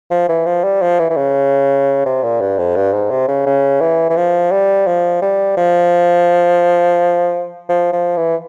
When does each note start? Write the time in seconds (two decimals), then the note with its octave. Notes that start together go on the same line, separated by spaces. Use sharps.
0.11 F3
0.29 E3
0.46 F3
0.64 G3
0.82 F3
0.99 E3
1.10 E3
1.17 C#3
2.06 C3
2.24 A#2
2.41 G2
2.58 F2
2.76 G2
2.93 G#2
3.10 C3
3.28 C#3
3.46 C#3
3.81 E3
4.10 E3
4.17 F3
4.52 G3
4.87 F3
5.22 G3
5.57 F3
7.69 F3
7.93 F3
8.17 E3